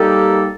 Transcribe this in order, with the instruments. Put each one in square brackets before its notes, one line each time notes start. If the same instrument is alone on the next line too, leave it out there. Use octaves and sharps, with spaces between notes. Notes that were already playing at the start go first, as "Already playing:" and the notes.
Already playing: [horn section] G3 A#3 D#4 G4 A#4 [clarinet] A4